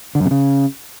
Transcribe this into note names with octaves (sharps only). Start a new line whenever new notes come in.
D3
F#2
C3
C#3